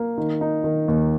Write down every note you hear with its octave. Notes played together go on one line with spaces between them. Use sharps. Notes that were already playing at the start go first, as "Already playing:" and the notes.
Already playing: A#3
D#3
D#4
D#3
D#2